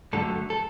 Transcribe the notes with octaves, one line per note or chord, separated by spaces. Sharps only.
G2 D3 F#3 A3 A4
A4